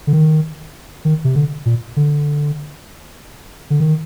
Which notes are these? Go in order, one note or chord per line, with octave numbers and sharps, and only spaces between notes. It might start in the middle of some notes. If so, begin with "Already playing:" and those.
D3
D#3
D#3
C3
D3
A#2
D3
D3
D#3